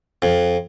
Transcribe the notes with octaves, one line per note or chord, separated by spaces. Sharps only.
F2